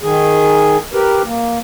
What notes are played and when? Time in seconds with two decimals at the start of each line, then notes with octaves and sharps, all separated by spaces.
0.02 D#3 G#4
0.94 G4 A#4 B4
1.26 A#3